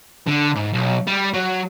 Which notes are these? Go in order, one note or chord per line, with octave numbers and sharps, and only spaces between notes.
D3
G#2
B1
G3
F#3